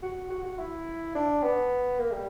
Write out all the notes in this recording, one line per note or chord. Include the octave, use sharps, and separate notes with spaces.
F#4
F#4
F#4
E4
D4
B3
A#3
G3